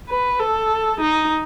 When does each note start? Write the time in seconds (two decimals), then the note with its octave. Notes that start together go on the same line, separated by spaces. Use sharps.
0.09 B4
0.39 A4
1.00 D#4